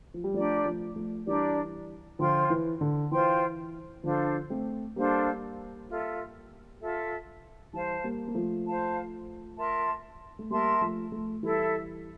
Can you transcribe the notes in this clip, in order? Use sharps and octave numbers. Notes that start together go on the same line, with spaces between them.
F3
G3
F3 A3 D4 G4 A#4 D5
F3 A3
F3 A3
E3 G3 D4 G4 A#4 D5
D3 F3 F4 C5 G5 C6
E3
D3
E3 F4 C5 G5 C6
D3 F3 D4 A4 C5 F5
A3 C4
G3 A#3 D4 A4 C5 F5
F4 A4 E5
F4 A4 E5
E3 G3 C5 F5 A5
G3 A#3
A#3
F3 A3
C5 F5 A5
A#4 E5 A5 C6
A3
G3 A#3 A#4 E5 A5 C6
F3 A3
F3 A3
E3 G3 E4 A4 E5